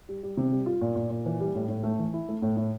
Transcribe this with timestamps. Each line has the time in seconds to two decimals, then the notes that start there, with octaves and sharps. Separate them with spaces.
0.09 G3
0.23 G3
0.37 C3
0.52 G3
0.66 F4
0.81 A#2
0.96 A#2
1.10 A#2
1.26 E3
1.40 G3
1.55 A2
1.69 A2
1.83 A3
1.99 E3
2.14 E4
2.29 A3
2.42 A2
2.57 A2